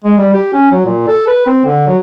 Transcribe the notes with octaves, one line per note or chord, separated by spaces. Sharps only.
G#3
G3
G4
C#4
F#3
A#2
A4
B4
C4
D3
F#3